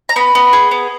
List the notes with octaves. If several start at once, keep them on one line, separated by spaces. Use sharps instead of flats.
A#5
B3 B5
B3
G#4
B3